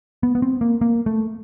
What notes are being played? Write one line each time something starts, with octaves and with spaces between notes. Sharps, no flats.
B3
B3
C4
A#3
A#3
A3